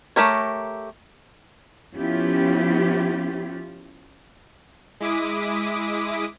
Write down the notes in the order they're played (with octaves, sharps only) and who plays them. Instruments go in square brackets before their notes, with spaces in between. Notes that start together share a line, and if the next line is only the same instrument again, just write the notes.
[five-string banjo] A3 G4 A#4 C#5
[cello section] F3 B3 C#4 E4 F4 G4
[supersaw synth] G#3 E4 D6 D#6 B6